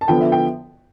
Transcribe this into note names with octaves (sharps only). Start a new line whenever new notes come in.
A5
D3 F3 B3 F4 G5
E5
G5